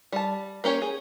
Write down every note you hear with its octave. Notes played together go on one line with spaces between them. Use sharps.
G3 A5
A#3 C#4 G4 C#5
G#4